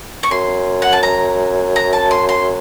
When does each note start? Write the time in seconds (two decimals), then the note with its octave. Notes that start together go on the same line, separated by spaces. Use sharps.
0.23 C#6
0.31 F#2 C6
0.82 F#5
0.93 A5
1.03 A#5
1.76 A#5
1.93 A5
2.11 C6
2.29 C6